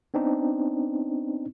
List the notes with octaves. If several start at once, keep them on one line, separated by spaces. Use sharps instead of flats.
B3 C4 D4 D#4